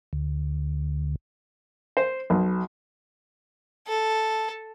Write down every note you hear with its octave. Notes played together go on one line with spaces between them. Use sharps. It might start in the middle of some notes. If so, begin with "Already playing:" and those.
D2
C5
B1
A4